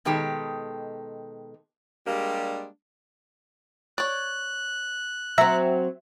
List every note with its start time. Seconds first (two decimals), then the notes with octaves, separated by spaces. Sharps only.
0.05 B2 D#3 G#3 G4 A4
2.07 G3 G#3 A#3 D4 G4
3.98 C#5 D5 F#6
5.38 F#3 C4 E5 A#5